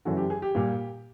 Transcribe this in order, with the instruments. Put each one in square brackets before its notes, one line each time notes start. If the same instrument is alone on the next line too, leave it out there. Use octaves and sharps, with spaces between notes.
[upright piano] F#2 C#3 E3 A3 F#4
G4
G#4
G4
A#2 G3 A#3